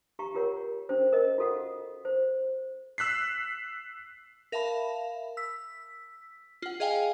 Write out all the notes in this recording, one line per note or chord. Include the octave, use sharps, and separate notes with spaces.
G4 F5 A#5 C#6
F4 G4 A#4 C#5 F#5
C#4 C5
A#4 D#5
F4 F#4 A4 F5 F#5
C5
E6 F#6 B6 C7
A#4 E5 F5 A5 B5
E6 B6
F4 F#5
G#4 D#5 F5 G5 G#5